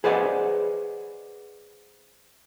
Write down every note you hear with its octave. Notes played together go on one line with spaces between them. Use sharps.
G#4 B4 C5 D5 D#5 F#5